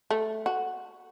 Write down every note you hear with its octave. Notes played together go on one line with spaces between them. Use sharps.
A3
F#4